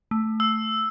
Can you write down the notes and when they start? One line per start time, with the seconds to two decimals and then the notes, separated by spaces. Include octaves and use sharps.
0.11 A3
0.40 E6